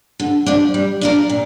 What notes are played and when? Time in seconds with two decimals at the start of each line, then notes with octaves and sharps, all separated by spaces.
0.20 D3
0.46 F3 D4
0.74 G3
1.01 D4 F4 A#4
1.30 A#2